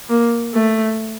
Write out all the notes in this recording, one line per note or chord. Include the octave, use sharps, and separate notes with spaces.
A#3
A3